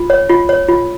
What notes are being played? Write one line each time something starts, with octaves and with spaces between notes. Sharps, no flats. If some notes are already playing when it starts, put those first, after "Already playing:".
Already playing: F4
C#5
F4
C#5
F4